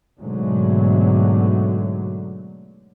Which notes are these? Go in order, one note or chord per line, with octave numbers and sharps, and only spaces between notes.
G#2 B2 D3 F#3 A3